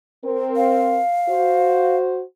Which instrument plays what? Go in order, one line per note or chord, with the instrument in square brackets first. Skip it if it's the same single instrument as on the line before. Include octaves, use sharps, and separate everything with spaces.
[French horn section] C4 A#4
[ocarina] F5
[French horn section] F#4 C5